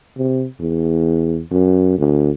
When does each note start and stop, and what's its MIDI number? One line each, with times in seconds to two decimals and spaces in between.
0.17 0.45 48
0.60 1.41 40
1.51 1.95 42
1.98 2.31 38